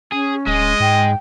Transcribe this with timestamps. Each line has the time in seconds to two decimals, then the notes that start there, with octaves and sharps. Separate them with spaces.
0.12 C#4 G#4
0.47 D1 G#3 D#5
0.80 G#2 G5